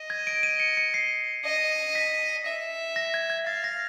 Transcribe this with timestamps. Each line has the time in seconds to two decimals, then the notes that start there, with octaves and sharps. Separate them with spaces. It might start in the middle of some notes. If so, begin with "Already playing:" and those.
Already playing: D#5
0.10 G#6
0.27 D7
0.43 D#7
0.60 C#7
0.77 C#7
0.94 C7
1.45 D#5
1.95 B6
2.46 E5
2.96 A#6
3.14 G#6
3.30 G#6
3.47 F5 A6
3.64 A#6